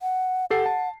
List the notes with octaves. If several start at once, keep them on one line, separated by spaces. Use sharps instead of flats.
F#5
G4 A4 F#5 C7
A5